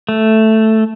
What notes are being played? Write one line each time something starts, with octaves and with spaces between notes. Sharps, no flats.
A3